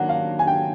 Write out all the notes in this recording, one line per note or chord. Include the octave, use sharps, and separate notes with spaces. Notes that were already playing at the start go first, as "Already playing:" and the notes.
Already playing: D#3 F#3 A#3 D4 G4 F#5
F5
G#5
G5